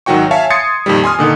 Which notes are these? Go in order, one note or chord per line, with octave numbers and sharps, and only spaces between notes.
G#1 D#3 F#3 F#4 G5 C#6
C#5 E5 F5 G#5 A5
C6 D#6 G#6 A6 C7 C#7
F2 A#2 D#3 G3
G#5 C6 D#6 F6
A#2 D3 D#3